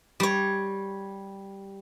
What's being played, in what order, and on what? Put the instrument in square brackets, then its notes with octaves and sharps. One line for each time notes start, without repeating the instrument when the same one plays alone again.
[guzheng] G3 C#5